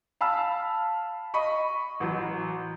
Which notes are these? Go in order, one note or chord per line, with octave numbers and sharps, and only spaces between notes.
F5 A5 B5 E6
D#5 B5 C#6
A1 F#3